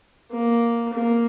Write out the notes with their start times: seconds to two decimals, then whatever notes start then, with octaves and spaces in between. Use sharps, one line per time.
0.31 A#3
0.93 A#3